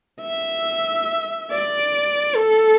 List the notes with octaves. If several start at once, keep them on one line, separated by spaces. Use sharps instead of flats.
E5
D5
A4